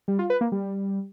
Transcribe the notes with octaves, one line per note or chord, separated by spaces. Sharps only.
G3
F4
B4
A#3
G3